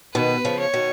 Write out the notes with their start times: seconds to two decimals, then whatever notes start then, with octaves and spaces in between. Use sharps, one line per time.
0.14 B2 D#3 B4
0.45 C#3 F3
0.59 C#5
0.74 B2 D#3